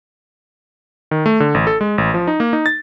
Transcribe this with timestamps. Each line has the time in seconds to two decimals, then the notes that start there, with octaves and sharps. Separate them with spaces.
1.11 D#3
1.26 A3
1.40 D3
1.54 A1
1.67 A4
1.81 G#3
1.98 A1
2.14 F3
2.27 D#4
2.40 A#3
2.53 D#4
2.66 A6